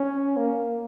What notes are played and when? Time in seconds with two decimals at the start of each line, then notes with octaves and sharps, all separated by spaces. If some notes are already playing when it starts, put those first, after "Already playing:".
Already playing: C#4
0.37 A#3